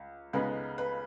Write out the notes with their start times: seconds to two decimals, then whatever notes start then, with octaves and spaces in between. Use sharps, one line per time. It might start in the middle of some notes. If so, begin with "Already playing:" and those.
Already playing: C#2
0.33 C#2 C#3 G#3 B3 D#4 B4 B5
0.78 B4 B5